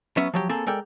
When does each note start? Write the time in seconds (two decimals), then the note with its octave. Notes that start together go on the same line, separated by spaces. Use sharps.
0.17 F#3 B3 C#4 E5
0.34 F3 F#3 G4
0.49 A#3 C4 G#4 A4
0.66 G#3 A4 A#4 D5 G5